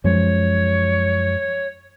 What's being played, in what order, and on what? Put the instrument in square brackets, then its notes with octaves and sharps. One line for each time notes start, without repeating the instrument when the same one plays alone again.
[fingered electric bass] F#2 F3 G#3 [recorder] C#5